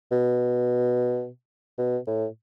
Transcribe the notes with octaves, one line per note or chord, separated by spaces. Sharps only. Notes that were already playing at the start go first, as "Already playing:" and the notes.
B2
B2
A2